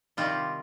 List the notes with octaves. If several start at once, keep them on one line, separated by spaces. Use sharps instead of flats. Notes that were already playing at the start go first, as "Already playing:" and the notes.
C3 D#3 G3 C4 F4